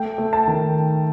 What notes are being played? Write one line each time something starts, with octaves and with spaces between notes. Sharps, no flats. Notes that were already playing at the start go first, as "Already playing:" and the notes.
Already playing: A3 G5
A3
A5
D#3